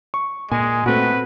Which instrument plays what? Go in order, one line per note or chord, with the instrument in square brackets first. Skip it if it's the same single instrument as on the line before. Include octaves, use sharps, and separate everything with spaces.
[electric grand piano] C#6
[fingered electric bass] A#2 [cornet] G#3 [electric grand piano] G#5
[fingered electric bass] A#2 A3 [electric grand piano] C4 F#4 [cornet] B4